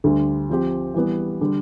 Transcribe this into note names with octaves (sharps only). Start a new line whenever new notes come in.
D2 D3 G3
F3 C4 G4
E3 G3 B3
D3 G3